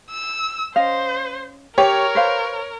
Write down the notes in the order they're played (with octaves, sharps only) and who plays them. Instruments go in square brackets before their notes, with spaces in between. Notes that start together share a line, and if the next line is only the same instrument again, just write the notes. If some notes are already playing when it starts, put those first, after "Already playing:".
[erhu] E6
[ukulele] C#4 D#5 F5 [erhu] C5
[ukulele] G4 [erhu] A#4 [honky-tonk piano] C#5
[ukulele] B4 C5 F5